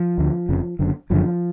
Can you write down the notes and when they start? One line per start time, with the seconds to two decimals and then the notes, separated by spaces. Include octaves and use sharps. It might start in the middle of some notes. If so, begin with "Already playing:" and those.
Already playing: F3
0.18 D2 D3
0.49 F1 F2 C#3
0.79 F#1 F#2 D3
1.10 F#1 F#2 D3 F3